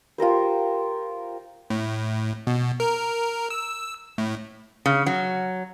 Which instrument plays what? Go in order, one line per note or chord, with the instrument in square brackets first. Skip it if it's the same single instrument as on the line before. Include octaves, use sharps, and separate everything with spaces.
[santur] F4 G4 A#4 C5
[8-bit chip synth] A2
B2
A#4
E6
A2
[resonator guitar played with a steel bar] C#3
F#3